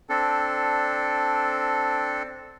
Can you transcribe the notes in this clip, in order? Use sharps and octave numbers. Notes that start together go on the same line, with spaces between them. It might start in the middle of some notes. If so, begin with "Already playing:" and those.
C4 D4 A4